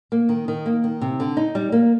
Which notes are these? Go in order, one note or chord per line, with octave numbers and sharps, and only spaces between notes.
A#3
D#3
D#3
A#3
D#3
C3
D3
D#4
G3
A#3